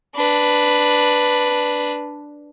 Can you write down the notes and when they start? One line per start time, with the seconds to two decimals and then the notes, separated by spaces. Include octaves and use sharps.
0.16 D4 B4